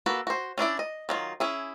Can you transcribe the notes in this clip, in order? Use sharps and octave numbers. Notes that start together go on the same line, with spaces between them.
A#3 F#4 A4 B4
F#4 C5
C#4 D4 E4 D5
D#5
D#3 F#3 F4
C#4 E4 G#4